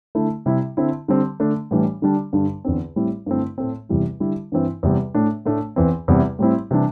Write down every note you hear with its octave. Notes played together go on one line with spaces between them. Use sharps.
D3 A3 E4
C3 G3 E4
D3 C4 E4
D3 G3 C4
D3 A3 D4
A2 E3 G3 D4
D3 G3 D4
G2 D3 G3 D4
E2 D3 C4
A2 G3 C4 E4
G2 D3 A3 C4 E4
A2 A3 C4
E2 C3 E3 G3 E4
D3 G3 E4
G2 E3 C4 E4
E2 C3 G3
A2 A3 D4
A2 A3 D4
E2 E3 C4
E2 C3 G3 C4 E4
A2 G3 C4 E4
C3 E3 G3 D4